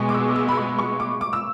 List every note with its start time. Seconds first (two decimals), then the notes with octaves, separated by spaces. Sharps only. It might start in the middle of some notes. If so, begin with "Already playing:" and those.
Already playing: B2 G#3 B3 G#5 C#6
0.09 D6
0.14 E6
0.28 D6
0.36 E6
0.48 B5
0.57 C#6
0.78 C#6
1.00 D6
1.21 D6
1.33 E6